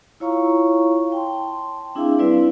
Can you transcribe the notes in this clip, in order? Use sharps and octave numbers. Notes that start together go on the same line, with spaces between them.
E4 F4 C#5 F5 A#5 C#6
G5 A5 C6
C4 D4 E4 G#4 E5 F5
G3 C4 E4 B4 D5